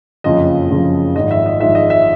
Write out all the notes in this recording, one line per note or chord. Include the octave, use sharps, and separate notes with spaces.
F#1 F2 C#3 F3 D#5
F#1 F2 C#3 F3
G#1 G#2 F3 D#5
E5
D#5
G#1 G#2 F3 E5
D#5
E5